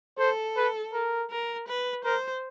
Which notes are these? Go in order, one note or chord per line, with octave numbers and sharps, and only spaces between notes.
A4 C5
B4
A#4
A#4
B4
A#4 C5